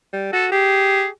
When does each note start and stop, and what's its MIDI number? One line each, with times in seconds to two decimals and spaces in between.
0.13 0.28 55
0.33 0.51 66
0.33 0.46 69
0.52 1.07 67
0.52 1.07 68